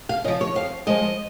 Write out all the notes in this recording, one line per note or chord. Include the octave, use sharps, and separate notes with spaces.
F5
C#3 F3 D#5
C#5
F2 F5
F3 G#3 D#5